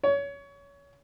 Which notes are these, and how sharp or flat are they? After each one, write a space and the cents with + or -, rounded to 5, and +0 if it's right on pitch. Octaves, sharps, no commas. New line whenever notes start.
C#5 +25